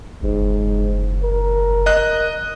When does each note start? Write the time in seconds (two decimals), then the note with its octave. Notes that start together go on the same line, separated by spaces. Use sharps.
0.23 F#1 G#2
1.23 A#4
1.86 D#5 F#6